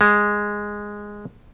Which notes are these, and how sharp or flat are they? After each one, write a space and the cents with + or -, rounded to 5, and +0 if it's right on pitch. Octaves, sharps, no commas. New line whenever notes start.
G#3 -5